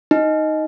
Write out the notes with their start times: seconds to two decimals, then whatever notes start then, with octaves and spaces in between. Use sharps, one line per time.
0.11 D#4